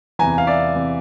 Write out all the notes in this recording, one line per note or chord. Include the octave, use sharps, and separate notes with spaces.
E2 C3 E3 G#5 A#5
F5
D5 E5
C3 E3